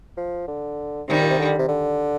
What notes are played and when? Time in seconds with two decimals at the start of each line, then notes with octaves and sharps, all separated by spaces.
0.17 F3
0.48 D3
1.08 C3 D#3 G3
1.22 A#2
1.30 C3
1.39 D3
1.59 C3
1.68 D3